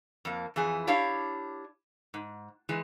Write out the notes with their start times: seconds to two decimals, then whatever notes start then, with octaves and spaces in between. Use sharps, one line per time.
0.25 F2 A#3
0.56 F2 E3 E4 G#4
0.87 D4 E4 G4 C#5 F5
2.14 G#2
2.69 E3 G#3